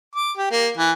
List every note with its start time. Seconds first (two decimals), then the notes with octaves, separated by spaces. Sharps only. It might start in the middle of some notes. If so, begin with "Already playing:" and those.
0.15 D6
0.37 G4
0.51 A#3
0.77 E3